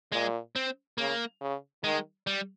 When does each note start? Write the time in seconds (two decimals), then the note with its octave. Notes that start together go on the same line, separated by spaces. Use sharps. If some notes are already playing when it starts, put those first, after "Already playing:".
0.12 A#2 G#3
0.56 C4
0.98 C#3 A#3
1.41 C#3
1.84 D#3 G#3
2.27 G3